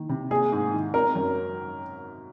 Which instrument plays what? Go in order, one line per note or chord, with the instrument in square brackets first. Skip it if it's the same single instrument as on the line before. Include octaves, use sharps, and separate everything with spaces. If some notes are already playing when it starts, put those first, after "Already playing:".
Already playing: [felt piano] D#3 A#3
C3
[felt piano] A#3 [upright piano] G#4
[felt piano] G#2
D#3
[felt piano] C4 [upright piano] A#4
[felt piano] F#2